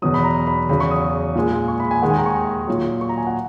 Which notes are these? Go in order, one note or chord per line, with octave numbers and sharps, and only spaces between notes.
E2 B2 F#3 D#6
B5
A#5
B5
E2 C#3 F#3 B5
C#6
D#6
A#2 G#3
C#6
B5
G#5
D#2 D#3 G#3 F#5
G#5
A#5
C#6
A#2 F#3
C#6
A#5
G#5
F#5